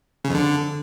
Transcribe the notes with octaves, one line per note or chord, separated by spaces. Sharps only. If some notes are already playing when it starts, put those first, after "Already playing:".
C#3
F2
D3